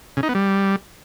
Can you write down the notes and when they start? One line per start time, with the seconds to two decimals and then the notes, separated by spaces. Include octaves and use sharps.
0.17 C#3
0.23 D#4
0.29 B3
0.35 G3